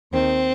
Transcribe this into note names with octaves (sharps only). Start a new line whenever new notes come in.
D#2 D#3 C4